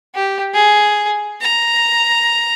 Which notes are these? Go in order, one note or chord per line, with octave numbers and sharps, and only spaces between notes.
G4
G#4
A#5